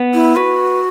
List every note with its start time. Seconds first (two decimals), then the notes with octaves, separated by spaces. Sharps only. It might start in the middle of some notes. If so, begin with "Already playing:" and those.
Already playing: B3
0.14 E4
0.36 F#4 B4